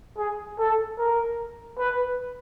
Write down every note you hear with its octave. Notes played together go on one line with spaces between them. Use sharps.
G#4
A4
A#4
B4